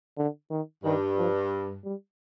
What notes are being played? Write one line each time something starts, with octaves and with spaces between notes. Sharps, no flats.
D3
D#3
G2 D#3
F3
G3